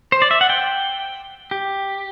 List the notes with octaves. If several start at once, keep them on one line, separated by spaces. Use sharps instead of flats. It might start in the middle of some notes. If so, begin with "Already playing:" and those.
C5
D5
E5
F#5
G5
G4